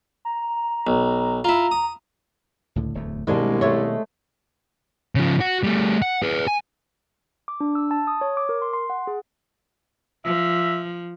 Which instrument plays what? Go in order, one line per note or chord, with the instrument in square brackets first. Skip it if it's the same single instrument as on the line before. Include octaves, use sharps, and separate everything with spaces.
[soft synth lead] A#5
[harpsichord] B1
[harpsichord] E4 F4 [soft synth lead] A#5
[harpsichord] D#6
[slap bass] C#2 A2 D3
D1 E2 A3
[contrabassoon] C2 [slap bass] B2 D#3 [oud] G#3 A#3 D4
[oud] G#3 A3 C#5
[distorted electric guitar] C#3 F3
F#4
G3 A3
F#5
G#4 B4
G#5
[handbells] D6
D4
E6
A5
D#6
C#5
D6
A#4
C6
C6
F#5
G#4
[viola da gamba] F3 [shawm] E5